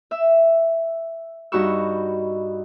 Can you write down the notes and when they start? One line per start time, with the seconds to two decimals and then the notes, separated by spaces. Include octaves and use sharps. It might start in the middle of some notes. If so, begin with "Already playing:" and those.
0.11 E5 E6
1.52 G2 D#4 F#4 B5 C#6 E6